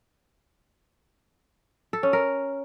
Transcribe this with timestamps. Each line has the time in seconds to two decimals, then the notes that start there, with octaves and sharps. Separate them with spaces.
1.93 A4
2.03 C#4
2.13 A#4